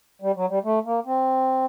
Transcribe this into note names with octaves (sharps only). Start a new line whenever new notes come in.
G3
F#3
G3
A3
A#3
C4